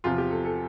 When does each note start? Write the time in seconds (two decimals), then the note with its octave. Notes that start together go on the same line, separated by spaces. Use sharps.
0.04 E2 C3 F3 F4
0.18 G4
0.30 A4
0.44 A4